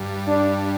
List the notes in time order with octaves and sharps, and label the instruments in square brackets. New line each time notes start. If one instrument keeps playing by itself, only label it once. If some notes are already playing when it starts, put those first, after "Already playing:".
Already playing: [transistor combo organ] G2
[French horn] D4